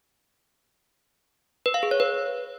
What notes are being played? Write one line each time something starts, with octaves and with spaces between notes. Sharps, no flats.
B4
F5
G#4
C#5
B4